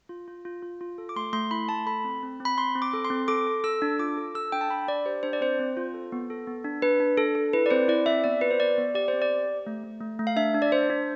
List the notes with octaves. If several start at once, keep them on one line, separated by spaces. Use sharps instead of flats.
F4
F4
F4
F4
F4
A4
D6
A3 C6
A3 C6
E4 B5
A3 A5
A4 B5
C4
C4
C4 B5
C4 C6
C4
D6
A4
C6
C4
A4 D6
A4
A4 E6
D4
F4 D6
A4
A4 E6
D4 G5
A5
D4 B5
D4 D5
G4 C5
D4 C5
D5
C4 C5
C4
F4
A4
B3
A4
B3
D4
D4 B4
D4
D4 A4
A4
E4 B4
D5
C4 C5
E4 D5
C4 E5
B3 D5
F4 B4
C5
B3 D5
B3
G4 D5
C5
C4
D5
G4
G4
A3
A3
A3
A3
F5
D4 E5
D4
D5
D4 C5
D4